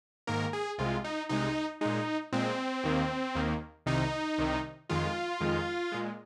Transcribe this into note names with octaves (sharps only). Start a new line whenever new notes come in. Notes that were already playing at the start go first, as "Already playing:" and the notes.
G#2 D#3 A#3 A#4
G#4
C2 C3 G#3 F4
D#4
C2 C3 G#3 D#4
A#2 G#3 D#4
A#2 G#3 C4
D#2 D#3 A#3
D#2 D#3 A#3
C2 C3 D#3 D#4
C2 C3 D#3
F2 D#3 G#3 F4
F2 D#3 G#3
A#2 G#3